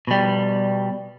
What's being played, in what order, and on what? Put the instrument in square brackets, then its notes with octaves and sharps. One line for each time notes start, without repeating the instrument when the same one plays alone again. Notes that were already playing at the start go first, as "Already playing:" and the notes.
[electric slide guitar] B2 G3